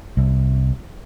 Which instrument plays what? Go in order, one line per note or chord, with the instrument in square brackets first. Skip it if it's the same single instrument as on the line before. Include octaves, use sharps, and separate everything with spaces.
[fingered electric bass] C2